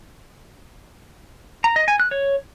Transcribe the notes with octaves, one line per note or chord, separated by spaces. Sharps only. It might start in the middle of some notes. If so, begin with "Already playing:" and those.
A#5
D#5
G#5
F#6
C#5